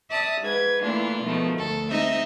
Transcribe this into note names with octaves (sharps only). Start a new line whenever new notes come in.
D5 E5 A5 D#6
G#2 B4 G#6
E3 A3 A#3 D4 E4 F4
B2 D#3 F3 G#3 A3
D2 A4
G#3 C4 D#4 D#5 E5